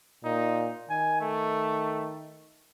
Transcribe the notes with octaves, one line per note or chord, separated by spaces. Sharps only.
A#2 D#4
D#3 G#5
A3